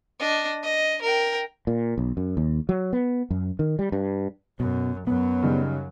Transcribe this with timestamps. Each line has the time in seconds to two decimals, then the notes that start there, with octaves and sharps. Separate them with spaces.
0.19 D4 D#5
0.63 D#5
1.02 A#4 G5
1.67 A#2
1.98 B1
2.17 F#2
2.37 D#2
2.69 F#3
2.93 B3
3.30 F#2
3.59 D#3
3.79 G3
3.92 G2
4.60 F#2 B2
5.07 F#2 F#3 B3
5.43 C#3 G3 D#4